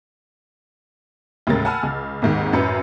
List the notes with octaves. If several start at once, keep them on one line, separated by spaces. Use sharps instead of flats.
D#2 A2 C#3 G#3 A#4 A6
F#5 G#5 A5 B5 E6 F6
C#2
G#1 D#2 G#2 D#3
A1 F#2 B4 G6 C#7